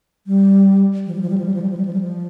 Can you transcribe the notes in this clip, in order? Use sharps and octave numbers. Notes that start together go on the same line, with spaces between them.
G3
F3
G3
F3
G3
F3
G3
F3
G3
F3
G3
F3
G3
F3